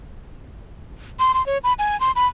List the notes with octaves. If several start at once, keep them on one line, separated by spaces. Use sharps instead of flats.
C6
C6
C#5
B5
G#5
C6
B5